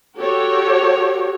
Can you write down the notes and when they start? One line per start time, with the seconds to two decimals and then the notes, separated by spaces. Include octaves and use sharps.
0.18 F#4 G4 A4 C#5